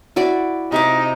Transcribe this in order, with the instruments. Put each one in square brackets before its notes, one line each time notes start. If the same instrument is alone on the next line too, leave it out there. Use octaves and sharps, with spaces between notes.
[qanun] E4 F#4 D5
[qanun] C3 E5 D6 [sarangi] D#4